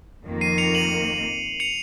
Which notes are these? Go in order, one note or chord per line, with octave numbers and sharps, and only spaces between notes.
F2 D#3 A#3
C7 D#7
C#7 F7
D#7 F#7
C#7 F7